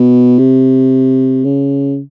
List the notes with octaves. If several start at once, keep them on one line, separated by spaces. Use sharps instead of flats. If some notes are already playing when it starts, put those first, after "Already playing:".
Already playing: B2
C3
C#3